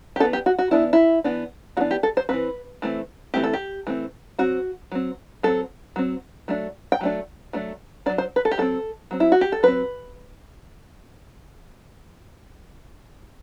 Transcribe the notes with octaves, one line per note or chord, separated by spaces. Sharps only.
G4
E3 B3 D4 A4
G4
F#4
F#4
E3 B3 D4 E4
E4
E3 B3 D4
E3 B3 D4 F#4
G4
A4
C5
E3 A3 C4 B4
E3 A3 C4
E3 A3 C4 G4
A4
G4
E3 A3 C4
F#3 C4 F#4
F#3 C4
F#3 C4 A4
F#3 C4
F#3 A3 D4
G5
F#3 A3 D4
F#3 A3 D4
F#3 A3 D4 D5
C5
B4
A4
G4
F#3 C4 A4
F#3 C4
E4
F#4
G4
A4
F#3 C4 B4